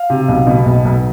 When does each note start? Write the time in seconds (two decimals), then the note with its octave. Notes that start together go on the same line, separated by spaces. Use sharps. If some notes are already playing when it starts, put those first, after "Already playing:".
Already playing: F5
0.10 C3
0.28 B1
0.47 B2
0.66 B1
0.85 B1